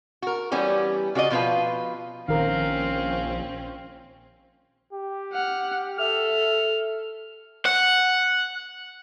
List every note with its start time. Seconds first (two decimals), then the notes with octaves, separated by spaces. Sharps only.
0.22 F#4 A#4
0.51 E3 G3 B3 C#4 G4
1.15 C#3 F#4 D5 D#5
1.30 B2 F3 F4 B4 F5
2.28 A#1 D#3 C4 C#4 A#4 F5
4.93 G4
5.33 F#5 F6
5.99 A4 E5 F6
7.66 F#5